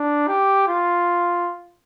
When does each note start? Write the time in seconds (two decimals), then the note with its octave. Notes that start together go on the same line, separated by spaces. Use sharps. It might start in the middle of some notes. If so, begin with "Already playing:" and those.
Already playing: D4
0.27 G4
0.68 F4